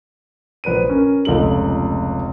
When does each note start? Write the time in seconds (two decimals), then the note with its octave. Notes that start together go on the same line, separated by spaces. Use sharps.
0.64 A#1 B4 C5 D#7
0.89 C#4 A#4
1.25 F1 C#2 A#2 A3 D#4 F#7